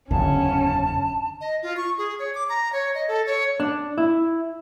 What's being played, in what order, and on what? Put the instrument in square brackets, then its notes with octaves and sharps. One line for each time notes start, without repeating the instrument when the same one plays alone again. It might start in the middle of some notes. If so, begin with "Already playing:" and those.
[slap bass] F#1 E2 G#2 [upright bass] D3 [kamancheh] C#4 [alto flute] A5
[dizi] D#5
F4
C#6
G#4
C#5
D6
A#5
C#5
D#5
A4
C#5
[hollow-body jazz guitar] D4
E4